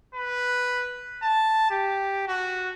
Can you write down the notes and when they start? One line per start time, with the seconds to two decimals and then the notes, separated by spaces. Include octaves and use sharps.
0.15 B4
1.23 A5
1.71 G4
2.28 F#4